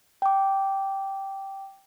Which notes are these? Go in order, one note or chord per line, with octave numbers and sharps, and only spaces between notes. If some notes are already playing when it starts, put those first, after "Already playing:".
G5 D6